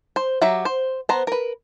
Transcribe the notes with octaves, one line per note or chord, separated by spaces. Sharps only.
C5
F#3 G4 E5 A#5
C5
B3 C5 A#5
A#4 B4